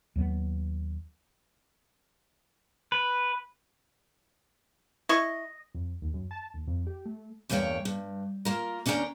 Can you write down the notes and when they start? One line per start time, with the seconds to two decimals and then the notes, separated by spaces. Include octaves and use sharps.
0.16 D#2 F#3 A3 B3
2.92 B4
5.09 E4 D#5 C#6
5.74 F2
6.02 D#2
6.14 F#2
6.31 A5
6.54 D#2
6.67 F2
6.87 G4
7.05 A3
7.49 E2 G2 A#3 F#4 C#5 G5
7.85 G2
8.45 A#3 F4 A#4
8.86 D#2 C#4 D4 E4 A#4 G5